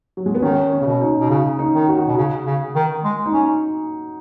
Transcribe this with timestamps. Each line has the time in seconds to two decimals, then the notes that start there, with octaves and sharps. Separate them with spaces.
0.17 F#3
0.26 G#3
0.35 B3
0.42 D#3 C#4
0.72 C#4
0.82 C#3
0.86 B2
1.01 D#4
1.20 B2
1.30 C#3
1.59 D#4
1.74 D#3
1.88 F#4
2.08 B2
2.17 C#3
2.46 C#3
2.75 D#3
3.04 G#3
3.26 D#4
3.34 C#4